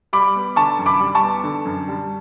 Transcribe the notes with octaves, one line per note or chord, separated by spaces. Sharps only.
G3 B5 D6
B3
D3 A5 C#6
F#2
B5 D6
G3
A5 C#6
B3
D3
F#2
G3